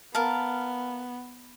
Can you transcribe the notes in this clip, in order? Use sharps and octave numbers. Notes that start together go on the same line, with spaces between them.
B3 A#4 F5 A5